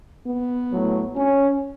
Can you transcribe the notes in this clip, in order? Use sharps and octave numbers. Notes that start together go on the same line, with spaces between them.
B3
A2 F#3
C#4